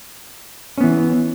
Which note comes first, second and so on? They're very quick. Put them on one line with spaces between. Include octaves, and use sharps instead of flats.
C#4 B3 E3